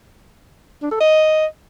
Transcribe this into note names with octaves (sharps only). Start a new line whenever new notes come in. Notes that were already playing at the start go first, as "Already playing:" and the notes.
D4
A4
D#5